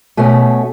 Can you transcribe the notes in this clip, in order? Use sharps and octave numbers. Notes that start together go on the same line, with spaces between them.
B2 A3 C#4